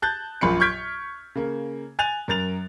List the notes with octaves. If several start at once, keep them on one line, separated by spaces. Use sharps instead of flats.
A5 F#6 G6 A6
A#1 F#2 A#2 F4 B5 C#7
C#6 F6 G6 G#6 B6 D7
C#3 A#3
G#5 F#6 A6 F7
F#2 A#4 A6 F7